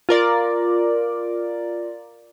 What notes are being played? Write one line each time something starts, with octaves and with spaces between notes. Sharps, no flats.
F4 A#4 D5